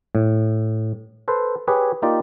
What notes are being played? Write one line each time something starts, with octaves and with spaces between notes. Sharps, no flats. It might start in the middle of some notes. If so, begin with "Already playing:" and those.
A2
A4 B4 C5
G4 G#4 B4 C#5
A#3 D#4 F4 G4 D5